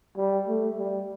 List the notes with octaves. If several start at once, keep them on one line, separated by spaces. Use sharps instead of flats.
G3
A3
G3